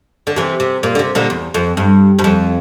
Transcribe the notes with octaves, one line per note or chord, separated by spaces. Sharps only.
D3
C3 E3
C3
A#2
D3
C3
A#2 D3
E2
F2
G2
G2
F2